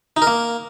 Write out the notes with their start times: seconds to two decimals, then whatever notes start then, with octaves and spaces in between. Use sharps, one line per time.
0.17 D#4
0.22 A#4
0.27 A#3